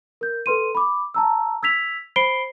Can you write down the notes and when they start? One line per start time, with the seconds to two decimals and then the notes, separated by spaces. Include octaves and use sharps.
0.21 A#4 G6
0.46 A4 B4 C6 D#7
0.75 B5 D6
1.14 A5 A#5 E6
1.63 E6 G#6 B6 F7
2.16 C5 B5 C7 D7 G7